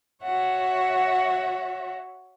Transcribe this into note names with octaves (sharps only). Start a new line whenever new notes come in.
F#4 C#5 E5 F#5